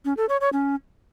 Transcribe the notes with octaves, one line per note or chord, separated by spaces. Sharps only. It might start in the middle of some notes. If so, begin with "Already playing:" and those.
C#4
A4
C#5
C#5
C#4